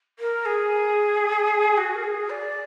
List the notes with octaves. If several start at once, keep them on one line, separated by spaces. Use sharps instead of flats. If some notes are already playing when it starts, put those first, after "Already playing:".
A#4
G#4
F#4
A#4
G#4
D5